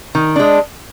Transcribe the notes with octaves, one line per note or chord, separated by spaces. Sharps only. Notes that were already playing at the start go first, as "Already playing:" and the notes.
D#3
G#3 D4